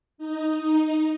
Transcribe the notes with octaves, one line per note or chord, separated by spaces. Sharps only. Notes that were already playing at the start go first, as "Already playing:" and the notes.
D#4